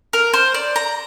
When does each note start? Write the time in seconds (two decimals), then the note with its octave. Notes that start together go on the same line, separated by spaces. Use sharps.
0.13 A#4
0.33 C5
0.54 D5
0.76 A#5